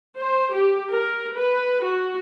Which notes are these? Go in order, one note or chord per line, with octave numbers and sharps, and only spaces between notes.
C5
G4
A#4
B4
F#4